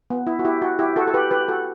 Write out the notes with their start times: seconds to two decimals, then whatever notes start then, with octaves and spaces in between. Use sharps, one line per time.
0.10 B3
0.27 E4
0.39 F#4
0.45 E4 G4
0.62 F#4
0.79 E4 G4
0.96 F#4 A4
1.07 A4
1.14 G4 B4
1.31 G4 B4
1.48 F#4 A4